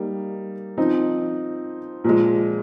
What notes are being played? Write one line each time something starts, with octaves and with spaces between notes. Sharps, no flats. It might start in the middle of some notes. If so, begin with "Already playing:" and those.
Already playing: G3 A#3 D#4
F3 C4 D#4
A#2 F3 G#3